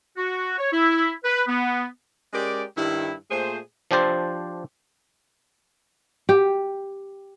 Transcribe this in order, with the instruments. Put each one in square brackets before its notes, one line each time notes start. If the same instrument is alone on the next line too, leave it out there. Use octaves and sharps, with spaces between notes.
[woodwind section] F#4
C#5
E4
B4
B3
[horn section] G#3 C#4 G4 A#4 D5
G2 D#3 G3 E4
A#2 A3 G#4 C5
[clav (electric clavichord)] F3 D4 G4 C5 A5
[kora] G4